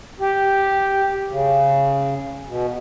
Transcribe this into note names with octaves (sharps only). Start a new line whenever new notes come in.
G4
C#3
B2